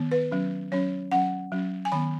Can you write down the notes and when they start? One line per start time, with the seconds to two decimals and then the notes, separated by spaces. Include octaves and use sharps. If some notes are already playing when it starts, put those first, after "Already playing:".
Already playing: D#3 B3
0.11 B4
0.32 F#3 C#4
0.72 F#3 C#4 C#5
1.11 F#3 C#4 F#5
1.52 F#3 C#4
1.85 G#5
1.92 D#3 B3 B5